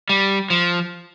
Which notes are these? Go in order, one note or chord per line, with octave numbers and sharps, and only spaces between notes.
G3
F3